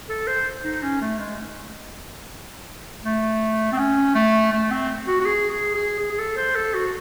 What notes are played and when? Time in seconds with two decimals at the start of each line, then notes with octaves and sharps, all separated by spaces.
0.09 A4
0.28 C5
0.64 D#4
0.83 C#4
1.01 A3
1.19 G#3
3.04 A3
3.73 C4
3.78 C#4
4.15 A3
4.52 A3
4.71 C4
5.08 F#4
5.21 F#4
5.26 G#4
5.50 G#4
5.75 G#4
6.00 G#4
6.11 G#4
6.19 A4
6.37 C5
6.56 A4
6.74 F#4